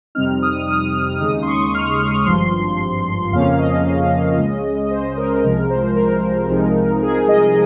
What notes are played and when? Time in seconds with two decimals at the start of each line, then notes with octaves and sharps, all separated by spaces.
0.15 F2 C3 G3 C4 D#4 F6
0.42 D#6
0.68 D#6
0.94 F6
1.20 D#2 C#3 G#3 D#4 D#6
1.42 C6
1.47 C#6
1.74 F6
2.26 G#1 G2 F3 C6
3.32 F2 C#3 F3 A#3 C#4 F5
3.58 D#5
4.37 C#2 C#3 G#3 C#4
4.91 C5
5.17 A#4
5.43 C2 C3 F3 G#3 A#4
5.70 C5
5.96 A#4
6.49 C2 C3 F3 G#3 D#4
7.02 G#4
7.28 D#5